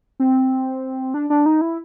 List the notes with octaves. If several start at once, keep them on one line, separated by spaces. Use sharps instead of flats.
C4
D4
D4
D#4
E4